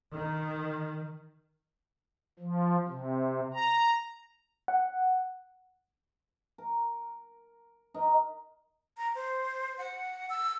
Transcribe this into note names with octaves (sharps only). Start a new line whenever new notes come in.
D#3
F3
C3
A#5
F#5
A#4
D#4 A#4
A#5
C5
F#5
E6